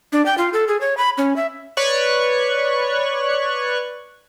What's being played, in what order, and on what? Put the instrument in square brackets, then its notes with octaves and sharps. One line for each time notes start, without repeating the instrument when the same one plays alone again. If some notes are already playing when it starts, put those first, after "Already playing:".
[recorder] D4
G5
F4
A4
G#4
C#5
B5
C#4
E5
[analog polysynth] B4 C#5 D5 C#6 F#6